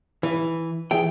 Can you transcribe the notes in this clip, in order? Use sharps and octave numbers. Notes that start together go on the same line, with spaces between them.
E3
E3 G#4 E5 G5